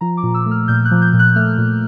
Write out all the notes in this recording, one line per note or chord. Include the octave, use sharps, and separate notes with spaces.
F3 A#5
D6
A#2
E6
A3
F6
A#2 G6
F#6
F3
G6
A#2
F#6
A3 F6
A#2